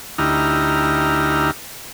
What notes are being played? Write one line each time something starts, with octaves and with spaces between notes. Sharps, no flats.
D2 D#4 E4 G4 A#5 F6